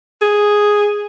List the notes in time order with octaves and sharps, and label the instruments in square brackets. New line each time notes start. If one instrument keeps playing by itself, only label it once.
[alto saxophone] G#4